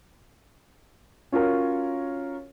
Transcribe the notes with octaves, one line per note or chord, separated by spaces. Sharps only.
C#4 F4 F#4 A#4 C#5